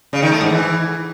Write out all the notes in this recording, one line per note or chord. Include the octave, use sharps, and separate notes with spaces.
C#3
D#3
A3
G#2
E3